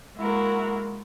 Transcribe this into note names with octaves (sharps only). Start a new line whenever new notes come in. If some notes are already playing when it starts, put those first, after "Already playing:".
G#3 A#3 E4 F#4 A#4